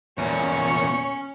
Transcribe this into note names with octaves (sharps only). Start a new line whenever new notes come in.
E2 A#2 C#4 C#5